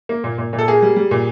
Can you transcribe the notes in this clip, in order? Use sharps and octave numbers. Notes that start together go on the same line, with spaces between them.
A#3
A#2
A#2
A#2
A4
A#3 G#4
G3
G3
A#2